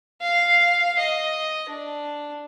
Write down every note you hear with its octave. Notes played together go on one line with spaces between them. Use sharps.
F5
D#5
D4